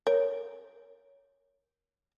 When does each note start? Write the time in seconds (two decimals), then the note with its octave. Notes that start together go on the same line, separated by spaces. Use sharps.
0.07 A#4 C#5